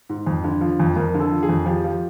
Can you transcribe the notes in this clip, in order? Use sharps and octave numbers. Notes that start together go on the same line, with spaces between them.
G#2
F2
D3
F3
F2
F2 A#4
D3
A4
F3
G#4
F2
F3 G4
F3